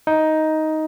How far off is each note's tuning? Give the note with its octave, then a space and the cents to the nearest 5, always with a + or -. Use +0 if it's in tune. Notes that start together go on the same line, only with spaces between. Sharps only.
D#4 +10